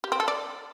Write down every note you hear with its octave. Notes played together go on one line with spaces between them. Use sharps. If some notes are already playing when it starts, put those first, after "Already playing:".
G4
C4
A4
D5